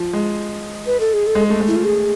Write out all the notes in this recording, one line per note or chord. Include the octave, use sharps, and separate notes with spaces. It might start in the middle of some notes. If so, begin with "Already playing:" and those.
Already playing: F3
G#3
B4
A4
G#4
A4
G#3
A3
G#3
E4
F4
G#4